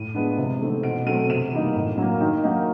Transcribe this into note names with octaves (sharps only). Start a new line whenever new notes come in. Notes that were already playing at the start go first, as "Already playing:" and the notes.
Already playing: A2 D#7
F3 G#3 B3 D4
C3
E3 A3 C4 D#4
B2 D7
F#3 A3 C4 D#7
C3 E7
E3 G3 A#3 D#4
A2
F#3 A#3
D#3
F#3 A#3 D#4